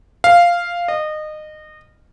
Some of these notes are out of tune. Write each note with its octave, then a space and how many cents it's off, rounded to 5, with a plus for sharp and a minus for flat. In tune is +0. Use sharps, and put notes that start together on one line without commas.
F5 -5
D#5 -25